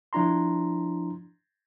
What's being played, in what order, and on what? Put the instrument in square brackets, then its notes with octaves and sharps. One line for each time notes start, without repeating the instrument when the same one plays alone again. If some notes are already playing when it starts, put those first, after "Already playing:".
[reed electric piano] F3 D4 E4 A#5 C6